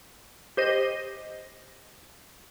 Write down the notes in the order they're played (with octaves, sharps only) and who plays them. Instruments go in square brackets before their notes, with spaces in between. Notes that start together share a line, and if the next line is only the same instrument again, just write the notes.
[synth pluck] G4 C5 D#5